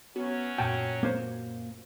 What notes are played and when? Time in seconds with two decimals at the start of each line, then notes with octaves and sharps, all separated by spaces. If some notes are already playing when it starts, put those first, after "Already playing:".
0.16 F#3 B3 C#4 F#4 B4
0.58 F#2 A#2 F#4 G5 A5
1.03 A#3 C5